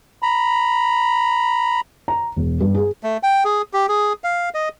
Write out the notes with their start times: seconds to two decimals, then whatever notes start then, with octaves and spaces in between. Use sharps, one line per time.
0.22 A#5 B5
2.08 A#5
2.36 E1
2.61 G2
2.75 G#4
3.03 A3
3.23 G5
3.45 G#4
3.73 G4
3.89 G#4
4.24 F5
4.54 D#5